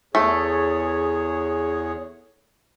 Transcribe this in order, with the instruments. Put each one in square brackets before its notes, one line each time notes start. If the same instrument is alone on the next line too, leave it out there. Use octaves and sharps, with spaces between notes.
[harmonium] E2 G#4 C#5 [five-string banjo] A3